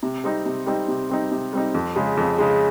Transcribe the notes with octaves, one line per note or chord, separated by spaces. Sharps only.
C3
G3 C4 D#4
C3
G3 C4 D#4
C3
G3 C4 D#4
C3
G3 C4 D#4
F2
C#3 G#3
F2
C#3 G#3